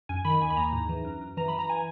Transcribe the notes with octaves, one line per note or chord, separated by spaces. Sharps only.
F#2 G#5
D#3 B5
D#2 G#5
B5
D#2 A#5
G#2
E3
F#2
F#2
E3 A#5
E3 B5
A#5
G#5